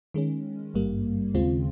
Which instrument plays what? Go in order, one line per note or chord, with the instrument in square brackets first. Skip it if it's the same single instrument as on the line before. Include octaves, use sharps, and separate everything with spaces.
[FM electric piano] D#3 G#3 C#4
G#1 G2 G3 A#3
D#2 C#3 G#3 C4 F4